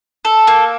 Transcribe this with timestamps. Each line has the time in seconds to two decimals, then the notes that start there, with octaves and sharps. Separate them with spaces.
0.25 A4
0.47 A#3